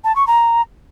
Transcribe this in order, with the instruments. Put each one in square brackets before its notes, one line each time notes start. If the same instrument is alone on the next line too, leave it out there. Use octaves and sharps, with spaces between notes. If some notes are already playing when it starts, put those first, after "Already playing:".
[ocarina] A5
C#6
A#5